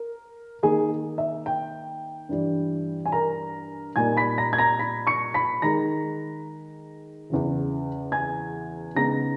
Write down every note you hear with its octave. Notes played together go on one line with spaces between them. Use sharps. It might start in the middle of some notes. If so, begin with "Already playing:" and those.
Already playing: A#4
D#3 A#3 D#4 G#4 G#5
E5
G5
G2 E3 G3
G#5
A#4 A#5
A#2 G3 A#3 D#4 G#5 G#6
B5 B6
A#5 A#6
G#6
A#5 A#6
B5 B6
C#6 C#7
B5 B6
D#3 G#3 D#4 A#5 A#6
E2 C#3 E3
G#5 G#6
C#3 G#3 B3 D#4 A#5 A#6